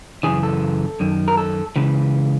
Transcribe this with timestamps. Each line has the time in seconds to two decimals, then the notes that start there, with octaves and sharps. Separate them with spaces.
0.23 F#2 C#3 E3 G#4
0.43 A4
1.00 F#2 D#3
1.28 A#4
1.37 A4
1.76 C#2 C#3 E3